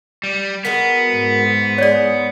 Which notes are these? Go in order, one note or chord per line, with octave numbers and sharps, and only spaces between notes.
G3
G#3 B3 F#4 A#4
G#2
E3 G#4 C#5 D5